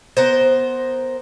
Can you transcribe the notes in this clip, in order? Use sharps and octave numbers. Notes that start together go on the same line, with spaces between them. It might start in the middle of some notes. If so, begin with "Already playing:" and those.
B3 A#4 C5